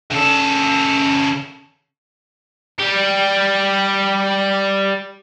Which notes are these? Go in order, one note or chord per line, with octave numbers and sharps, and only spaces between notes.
C#3 A4
G3 G4